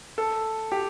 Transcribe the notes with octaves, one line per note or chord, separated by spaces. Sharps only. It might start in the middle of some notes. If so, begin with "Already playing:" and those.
A4
G4